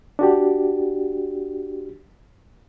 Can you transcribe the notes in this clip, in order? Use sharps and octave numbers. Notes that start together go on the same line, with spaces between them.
D4 F#4 G4